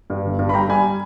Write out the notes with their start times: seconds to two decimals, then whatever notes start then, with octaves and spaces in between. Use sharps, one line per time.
0.10 G2
0.25 G1
0.39 G2
0.49 B5
0.54 G3 G5 A#5
0.69 G3 G#5 B5